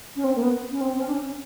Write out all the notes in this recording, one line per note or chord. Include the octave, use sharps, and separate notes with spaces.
C#4
C4
A#3
B3
C#4
C4
C4
C#4
D4
C#4
C#4